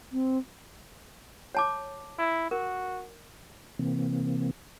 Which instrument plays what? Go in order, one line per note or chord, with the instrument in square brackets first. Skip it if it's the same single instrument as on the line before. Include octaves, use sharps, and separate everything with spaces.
[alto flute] C4
[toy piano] C#5 A5 D6
[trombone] E4
[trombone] F#4 [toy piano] A#4
[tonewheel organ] C3 E3 A#3 C4